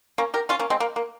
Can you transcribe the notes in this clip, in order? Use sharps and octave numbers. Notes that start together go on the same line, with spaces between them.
A#3 C#4
G4 A#4
C#4 F4
A#3 C#4
G#3 C4
A#3
A#3